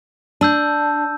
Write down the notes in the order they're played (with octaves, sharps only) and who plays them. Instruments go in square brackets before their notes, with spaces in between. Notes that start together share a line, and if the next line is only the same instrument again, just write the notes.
[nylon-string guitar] D4 [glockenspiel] A5 E6 G6